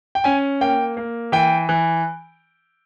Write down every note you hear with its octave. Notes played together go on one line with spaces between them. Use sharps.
G5
C#4 G#5
A#3 G5
A#3
E3 G5
E3